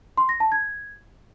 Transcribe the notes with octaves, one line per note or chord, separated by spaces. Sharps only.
C6
A#6
A5
G#6